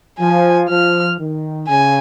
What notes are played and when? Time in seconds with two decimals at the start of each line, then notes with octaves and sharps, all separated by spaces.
0.19 F3 G#5
0.69 F3 F6
1.19 D#3
1.68 C#3 G#5